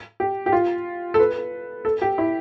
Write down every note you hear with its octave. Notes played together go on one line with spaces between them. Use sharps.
G4
G4
F4
A4
B4
A4
G4
E4